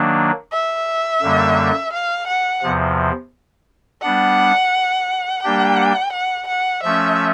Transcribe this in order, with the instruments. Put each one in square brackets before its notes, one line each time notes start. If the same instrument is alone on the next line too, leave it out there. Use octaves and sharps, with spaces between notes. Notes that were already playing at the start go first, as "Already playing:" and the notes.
Already playing: [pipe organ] D#3 F#3 A#3 D4
[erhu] E5
[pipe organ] F#2 D3 G3 A#3
[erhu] F5
F#5
[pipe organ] E2 C3 F3
[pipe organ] G3 B3 D4 [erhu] F#5
[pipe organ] G3 A#3 D4 G4 [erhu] G5
[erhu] F#5
F#5
[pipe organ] F3 A3 C#4 [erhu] E5